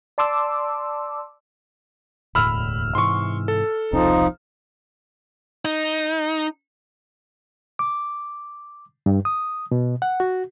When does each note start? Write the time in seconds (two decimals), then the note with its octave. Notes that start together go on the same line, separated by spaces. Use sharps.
0.18 D5 A5 C6 D6 E6
2.35 E1 D2 A2 B5 E6 F6
2.95 G#2 C3 E3 C6 C#6
3.48 A4
3.93 E1 C2 F3 C4 D#4
5.65 D#4
7.79 D6
9.06 G2
9.25 D#6
9.71 B2
10.02 F#5
10.20 F#4